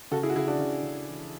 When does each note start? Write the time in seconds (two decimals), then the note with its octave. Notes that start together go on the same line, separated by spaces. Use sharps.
0.11 C#3 F#4 A4
0.23 E4 G#4
0.30 F#4
0.35 C#3 E4 G#4
0.48 D4 F#4
0.59 C#3
0.82 C#3
1.07 E3